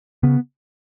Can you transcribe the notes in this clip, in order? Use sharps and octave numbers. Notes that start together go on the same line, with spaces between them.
C#3 B3